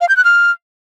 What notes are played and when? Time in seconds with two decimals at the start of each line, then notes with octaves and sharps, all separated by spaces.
0.01 F5
0.09 G6
0.17 F#6
0.24 F6